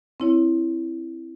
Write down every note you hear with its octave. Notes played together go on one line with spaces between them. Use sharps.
C4 E4 C#5